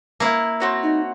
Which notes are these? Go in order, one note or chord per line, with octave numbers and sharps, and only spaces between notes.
A#3 E4
C4 F#4 C#5
D#4